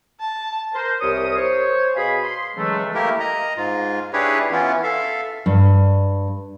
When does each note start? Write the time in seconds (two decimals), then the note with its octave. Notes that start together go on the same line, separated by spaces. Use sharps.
0.20 A5
0.74 A#4 C5
1.01 C2 G4 A#4 C#5 D#6
1.36 C5 C#5
1.95 B2 G#4 F5 G#5 B5
2.23 C6
2.56 C#3 E3 F#3 G#3 A3
2.94 A3 A#3 E4 G4 A#4
3.20 D#5 A#5
3.57 G#2 F4
4.13 D4 E4 G4 G#4 B4 C#5
4.52 E3 B3 C#4 E4 F4
4.83 A4 E5 F5
5.46 G2